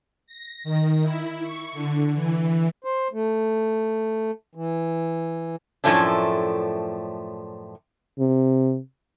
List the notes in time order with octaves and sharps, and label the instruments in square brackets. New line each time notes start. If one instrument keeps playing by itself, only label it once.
[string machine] A#6
D#3
E4
C#6
D3
E3
[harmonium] C5
A3
E3
[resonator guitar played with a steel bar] F#2 A2 F3 A3 C#4 D4
[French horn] C3